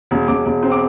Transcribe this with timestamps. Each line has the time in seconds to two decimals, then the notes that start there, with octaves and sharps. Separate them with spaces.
0.11 E1
0.28 E1 D6
0.45 E1
0.63 C4
0.72 D6